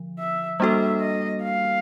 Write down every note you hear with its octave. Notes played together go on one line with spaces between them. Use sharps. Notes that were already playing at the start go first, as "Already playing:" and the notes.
Already playing: D3 F3
E5
G3 A#3 D4 F#4 A4 E5
D#5
F5